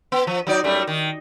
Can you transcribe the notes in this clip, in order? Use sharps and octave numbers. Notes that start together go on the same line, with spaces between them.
B3
F3
F#3 D#4 D5
F#2 G3 A3
D#3